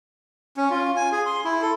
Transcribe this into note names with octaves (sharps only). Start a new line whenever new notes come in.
C#4
F4
G#5
G#4
C6
E4
A4